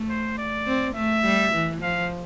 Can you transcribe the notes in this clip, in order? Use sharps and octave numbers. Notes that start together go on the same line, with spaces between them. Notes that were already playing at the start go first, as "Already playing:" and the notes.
Already playing: A3
C5
D5
C4
A3 E5
G3
E3
F3 F5